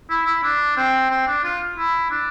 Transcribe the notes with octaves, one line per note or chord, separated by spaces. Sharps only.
E4
E4
D4
C4
C4
D4
F4
E4
D4